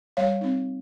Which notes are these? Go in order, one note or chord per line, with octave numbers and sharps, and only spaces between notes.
G3 C#5 F5
C4 D#4